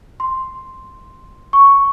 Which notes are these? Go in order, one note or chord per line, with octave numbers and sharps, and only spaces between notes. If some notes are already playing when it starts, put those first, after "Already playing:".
C6
C#6